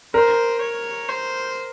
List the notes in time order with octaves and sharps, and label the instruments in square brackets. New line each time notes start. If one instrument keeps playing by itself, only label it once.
[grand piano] A#4 [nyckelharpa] C5
[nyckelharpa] C#5
C5